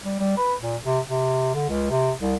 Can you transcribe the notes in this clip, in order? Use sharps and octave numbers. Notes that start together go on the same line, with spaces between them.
G3
G3
B4
A#2
C3
C3
D3
C#2
C3
C2